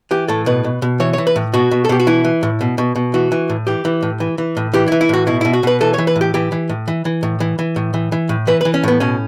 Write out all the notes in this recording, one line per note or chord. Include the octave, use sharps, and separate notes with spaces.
E3 G4
A2 A4
B2 B4
B2
B2
E3 C#5
C#5
E3
B4
A2
B2 F#4
B2
A4
B2 G4
F#4
E3 E4
E3
A2
B2
B2
B2
E3 F#4
E3
A2
E3 G4
E3
A2
E3
E3
A2
E3 G4
E4
E3
E4
A2 F#4
B2 E4
B2 E4
F#4
B2 B4
E3 A4
C#5
E3
B4
A2
G4
E3 G4
E3
A2
E3
E3
A2
E3
E3
A2
E3
E3
A2
E3 B4
B4
E3
C#4
A2 B3
B2 C#4